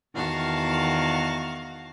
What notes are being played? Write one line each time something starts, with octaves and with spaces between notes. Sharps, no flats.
E2 D#3 F#4 F5 A5